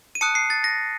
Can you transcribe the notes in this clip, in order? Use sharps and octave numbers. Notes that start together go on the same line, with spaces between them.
D#7
A5 D#6 F#6 C#7
C7
A6
A#6